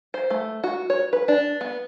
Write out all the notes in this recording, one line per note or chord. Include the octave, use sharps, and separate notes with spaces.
C5
A3
F#4
C#5
B4
D4
B3